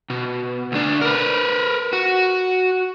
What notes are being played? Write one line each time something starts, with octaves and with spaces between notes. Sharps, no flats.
B2
D2 D4
A#4 B4
F#4